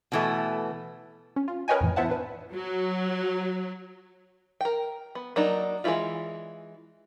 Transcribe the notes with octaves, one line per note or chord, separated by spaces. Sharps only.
B2 E3 A3
C#4
F4
A#4 B4 C#5 D#5 G5 G#5
F2 A2 E3
B3 E4 C5 E5 F#5 A5
D4 B4
F#3
A#4 G5
B3
F#3 A#3 D4 D#4
E3 G#3 C4 E4 F4